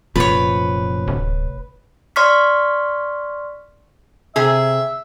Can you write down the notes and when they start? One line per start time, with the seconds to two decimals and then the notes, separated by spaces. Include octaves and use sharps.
0.16 F1 F#2 A#2 F3 B4 C#5
1.08 D1
2.16 D5 C6 C#6 F6 B6
4.36 C3 G#4 E5